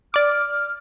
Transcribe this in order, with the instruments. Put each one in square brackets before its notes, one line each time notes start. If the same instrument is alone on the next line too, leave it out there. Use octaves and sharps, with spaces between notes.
[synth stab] D5 D6 [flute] F6